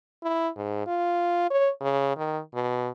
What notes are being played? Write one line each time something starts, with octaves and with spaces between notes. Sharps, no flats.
E4
G#2
F4
C#5
C#3
D#3
B2